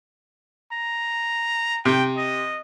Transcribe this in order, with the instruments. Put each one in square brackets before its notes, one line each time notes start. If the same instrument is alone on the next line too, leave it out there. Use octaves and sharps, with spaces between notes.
[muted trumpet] A#5
[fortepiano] C3 [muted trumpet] G5
[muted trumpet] D#5